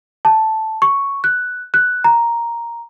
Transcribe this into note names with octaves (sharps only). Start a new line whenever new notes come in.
A5
C#6
F#6
F#6
A#5